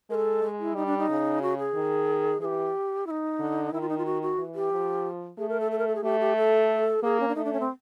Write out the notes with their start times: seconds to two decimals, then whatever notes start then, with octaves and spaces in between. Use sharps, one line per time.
0.10 G#3 A4 A#4
0.43 G#3
0.59 E4
0.75 G3 D#4
0.86 D4
0.98 D#4
1.09 C#3
1.42 F#4
1.58 G#4
1.75 D#3
2.40 E3 G#4
2.45 G4
3.07 E4
3.11 D#4
3.40 D3
3.73 D#3 E4
3.81 F4
3.89 D#4
3.98 F4
4.05 F#4
4.22 F#4
4.38 E3
4.55 G4
4.72 F3
5.38 A3 G#4
5.49 A#4
5.60 A4
5.72 A4
5.79 A#4
5.87 A4
5.95 G#4
6.04 A3 G4
6.20 G4
6.36 A4
7.03 A#3 G#4
7.20 C#4
7.28 D4
7.35 A3 D#4
7.45 D4
7.53 C#4
7.60 C4